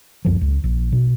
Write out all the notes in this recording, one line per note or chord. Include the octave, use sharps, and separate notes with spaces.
C#2 F#2 F3
C#2
A#1
B2